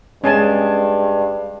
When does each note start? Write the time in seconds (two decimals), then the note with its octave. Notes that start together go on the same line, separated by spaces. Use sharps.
0.24 G2 G#3 C#4 G#5 A5